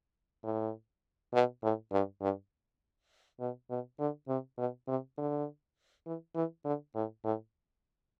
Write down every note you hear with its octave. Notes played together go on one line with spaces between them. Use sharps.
A2
B2
A2
G2
G2
B2
B2
D3
C3
B2
C3
D3
E3
E3
D3
A2
A2